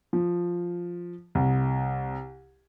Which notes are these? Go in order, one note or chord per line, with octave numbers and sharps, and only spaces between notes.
F3
C2